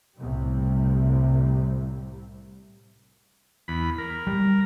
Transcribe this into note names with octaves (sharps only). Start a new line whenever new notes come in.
C2 A2 C3 G3
E2 B5
A#4
G3